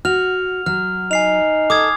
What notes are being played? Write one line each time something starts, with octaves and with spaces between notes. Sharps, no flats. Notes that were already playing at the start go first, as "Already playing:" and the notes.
F#4 F6 F7
F#3 F6
D#4 G#5 C7 F7
A4 D6 D#6 G#6